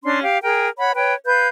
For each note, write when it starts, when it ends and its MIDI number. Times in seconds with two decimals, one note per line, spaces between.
0.04 0.22 61
0.04 0.22 62
0.04 0.22 84
0.23 0.37 67
0.23 0.37 77
0.43 0.68 68
0.43 0.68 70
0.43 0.68 79
0.78 0.91 73
0.78 0.91 78
0.78 0.91 83
0.95 1.13 71
0.95 1.13 73
0.95 1.13 79
1.25 1.48 71
1.25 1.48 77
1.25 1.48 91